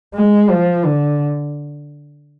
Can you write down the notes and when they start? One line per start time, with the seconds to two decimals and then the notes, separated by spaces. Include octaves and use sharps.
0.14 G#3
0.50 F3
0.85 D3